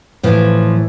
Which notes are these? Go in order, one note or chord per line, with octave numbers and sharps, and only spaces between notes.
A2 E3 F3